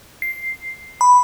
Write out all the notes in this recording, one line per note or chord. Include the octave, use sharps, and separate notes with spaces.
C7
B5